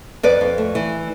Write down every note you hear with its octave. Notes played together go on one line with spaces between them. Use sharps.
F2 B4 D5
F2
A3
E3